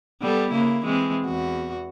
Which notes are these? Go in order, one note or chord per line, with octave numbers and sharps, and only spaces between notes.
G3 B3 A4
C#3 A#3 E4
E3 G#3 C4
E2 F#4